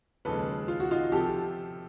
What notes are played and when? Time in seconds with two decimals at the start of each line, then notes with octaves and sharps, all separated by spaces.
0.25 D#2 C#3 F3 G#3 A4 B4
0.68 F4
0.80 F#4
0.91 D#4 F4
1.12 C3 F3 G4 A4